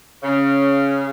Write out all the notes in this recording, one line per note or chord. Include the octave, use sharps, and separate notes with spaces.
C#3